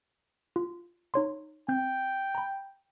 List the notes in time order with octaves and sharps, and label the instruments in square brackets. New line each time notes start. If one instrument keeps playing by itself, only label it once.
[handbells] F4
D#4 C#5 C6
[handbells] C4 G6 [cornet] G5
[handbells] A#5 B5